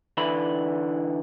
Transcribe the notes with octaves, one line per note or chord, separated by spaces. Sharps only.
D3 E3 B4 B5